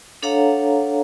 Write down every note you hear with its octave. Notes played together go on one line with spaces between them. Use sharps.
D4 A4 C#5 F5 F#5 A#5